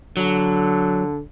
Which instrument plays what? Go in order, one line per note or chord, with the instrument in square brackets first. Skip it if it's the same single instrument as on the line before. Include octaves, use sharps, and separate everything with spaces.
[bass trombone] D3 [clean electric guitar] F#3